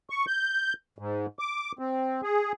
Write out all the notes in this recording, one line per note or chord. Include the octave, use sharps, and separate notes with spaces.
C#6
G6
G#2
D6
C4
G#4